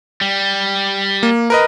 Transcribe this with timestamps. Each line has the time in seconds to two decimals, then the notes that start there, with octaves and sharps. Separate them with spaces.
0.21 G3
1.23 A#3
1.50 A#4 B4 D#5